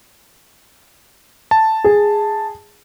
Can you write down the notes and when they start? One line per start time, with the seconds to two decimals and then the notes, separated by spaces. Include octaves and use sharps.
1.51 A5
1.84 G#4